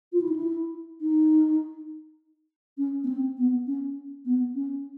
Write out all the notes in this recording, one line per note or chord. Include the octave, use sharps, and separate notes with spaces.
F4
E4
D#4
E4
D#4
C#4
B3
C4
B3
C#4
B3
C#4